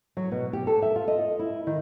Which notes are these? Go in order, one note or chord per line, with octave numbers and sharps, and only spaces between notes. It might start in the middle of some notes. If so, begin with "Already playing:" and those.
F#3
B2
G4
A4
E5
F4
D#5
E4
D#3